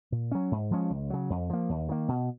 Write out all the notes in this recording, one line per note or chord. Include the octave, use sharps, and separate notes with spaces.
A#2
F#3 C#4
G#2
F3 G#3 C#4
C#2
C#3 F#3
F2
F3 A#3
D#2
D#3 A#3
B2